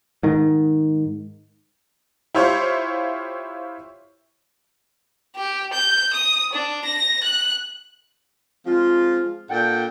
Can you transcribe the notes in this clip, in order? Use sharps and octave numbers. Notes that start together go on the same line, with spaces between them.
G#2 D#3
E4 F4 G4 C5 C#5
G4
G6
D#6
D4
A#6
F#6
F3 G#3 C4 F4
A#2 D4 A4 F#5 G5